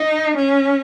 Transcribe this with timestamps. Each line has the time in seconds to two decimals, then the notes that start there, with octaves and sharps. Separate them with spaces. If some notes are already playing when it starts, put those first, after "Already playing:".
Already playing: D#4
0.36 C#4